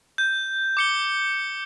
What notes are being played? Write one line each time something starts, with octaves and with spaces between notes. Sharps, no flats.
G6
D6 C#7 G7